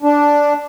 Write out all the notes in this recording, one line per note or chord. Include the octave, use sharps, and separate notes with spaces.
D4